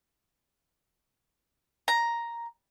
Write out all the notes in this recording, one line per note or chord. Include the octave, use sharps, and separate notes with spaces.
A#5